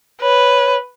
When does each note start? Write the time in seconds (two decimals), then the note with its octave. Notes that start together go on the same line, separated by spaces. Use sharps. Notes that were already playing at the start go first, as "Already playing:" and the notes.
0.22 B4 C#5